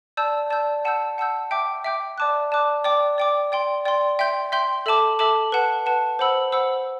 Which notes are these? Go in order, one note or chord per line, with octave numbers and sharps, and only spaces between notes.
D5 A5 E6 G6
D5 A5 E6 G6
F#5 A5 E6 G6
F#5 A5 E6 G6
E5 G5 D6 G6
E5 G5 D6 G6
D5 A5 D6 F#6
D5 A5 D6 F#6
D5 G5 D6
D5 G5 D6
D5 G5 C6
D5 G5 C6
E5 G5 C6 G6
E5 G5 C6 G6
A4 E5 A5 D6
A4 E5 A5 D6
B4 F#5 A5
B4 F#5 A5
C5 F#5 B5 E6
C5 F#5 B5 E6